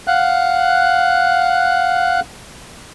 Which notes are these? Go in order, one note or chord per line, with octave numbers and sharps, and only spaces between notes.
F5 F#5 F#6